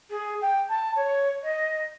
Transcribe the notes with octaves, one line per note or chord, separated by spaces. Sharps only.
G#4
G5
A5
C#5
D#5